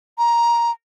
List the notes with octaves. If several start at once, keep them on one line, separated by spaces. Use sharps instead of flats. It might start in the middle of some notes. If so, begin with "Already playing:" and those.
A#5